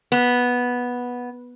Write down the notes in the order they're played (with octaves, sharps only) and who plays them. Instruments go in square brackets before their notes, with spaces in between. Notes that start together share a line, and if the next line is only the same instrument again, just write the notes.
[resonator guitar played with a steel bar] B3